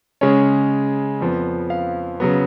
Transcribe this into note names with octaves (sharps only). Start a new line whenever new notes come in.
C#3 G#3 C#4 C#5
F2 F3 B3
F5
C#3 F#3 B3